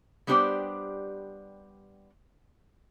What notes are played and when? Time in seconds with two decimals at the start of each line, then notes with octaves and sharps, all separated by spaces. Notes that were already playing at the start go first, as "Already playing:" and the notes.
0.27 G3 B3 D4 G4 C5 D5